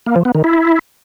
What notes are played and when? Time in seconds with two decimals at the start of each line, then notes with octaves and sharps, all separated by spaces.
0.06 A#3
0.16 F3
0.25 B3
0.35 D#3
0.44 E4